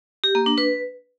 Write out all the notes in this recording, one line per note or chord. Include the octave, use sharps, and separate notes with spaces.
G4
A#3
D4
B4